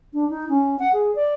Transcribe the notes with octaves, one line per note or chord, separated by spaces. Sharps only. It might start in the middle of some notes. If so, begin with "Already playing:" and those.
D4
D#4
C#4
F#5
G#4
D5